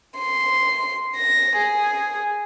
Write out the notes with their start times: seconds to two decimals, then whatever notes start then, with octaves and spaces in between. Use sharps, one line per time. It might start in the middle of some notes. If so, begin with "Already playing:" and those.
0.18 C6
1.16 A#6
1.57 G#4